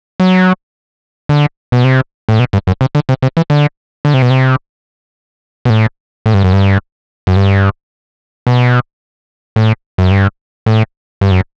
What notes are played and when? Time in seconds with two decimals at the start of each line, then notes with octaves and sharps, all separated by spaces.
0.20 F#3
1.29 D3
1.72 B2
1.84 C3
2.29 A2
2.39 B2
2.53 G2
2.67 F#2
2.81 C3
2.95 D3
3.09 C3
3.22 C3
3.37 E3
3.50 D3
4.05 D3
4.14 C3
4.22 B2
4.30 C3
5.65 B2
5.70 A2
6.26 A2
6.34 G2
6.44 F#2
6.53 G2
7.27 F#2
7.36 G2
8.47 B2
9.56 A2
9.98 F#2
10.11 G2
10.66 A2
11.21 G2
11.31 F#2